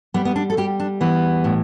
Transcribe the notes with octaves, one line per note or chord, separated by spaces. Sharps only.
G3 B3
B3
D4
A4
G3 G4
D4
E3 B3
A2